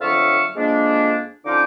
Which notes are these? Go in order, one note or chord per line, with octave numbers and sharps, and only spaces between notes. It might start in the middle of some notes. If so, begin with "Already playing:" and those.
F2 D3 F#3 E5 F5 C#6
F2 G#3 A#3 D4
D3 F3 C#4 D#4 C5 D6